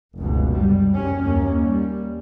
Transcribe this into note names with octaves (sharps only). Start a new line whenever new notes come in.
F1 C#2 F#2 B2
G3
F#2 C#4
D#2 A#3 C#4
G3